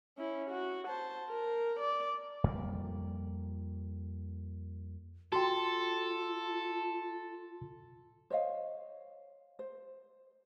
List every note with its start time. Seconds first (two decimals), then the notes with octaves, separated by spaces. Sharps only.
0.18 C#4 E4
0.50 F#4
0.88 C5 A5
1.29 A#4
1.80 D5
2.44 F2 G3 A#3
5.32 F4 F#4 A4 G5 A5 C6
8.30 C5 C#5 D#5 F5
9.59 C5